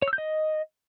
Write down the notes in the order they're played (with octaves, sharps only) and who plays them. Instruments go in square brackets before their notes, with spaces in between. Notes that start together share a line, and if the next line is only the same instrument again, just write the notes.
[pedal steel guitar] C#5
E6
G6
D#5